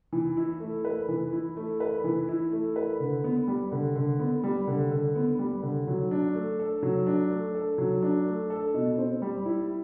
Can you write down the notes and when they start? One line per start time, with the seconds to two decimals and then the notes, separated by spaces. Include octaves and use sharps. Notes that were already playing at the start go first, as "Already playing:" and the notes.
0.13 E3
0.37 E4
0.60 A3
0.85 B4
1.09 E3
1.33 E4
1.57 A3
1.80 B4
2.04 E3
2.28 E4
2.52 A3
2.76 B4
3.00 D3
3.24 B3
3.48 G3
3.72 D3
3.96 D3
4.20 B3
4.44 G3
4.67 D3
4.91 D3
5.15 B3
5.39 G3
5.63 D3
5.87 F#3
6.11 D4
6.35 A3
6.59 A4
6.83 F#3
7.07 D4
7.31 A3
7.55 A4
7.78 F#3
8.03 D4
8.26 A3
8.50 A4
8.74 B2
8.98 C4
9.22 G3
9.45 E4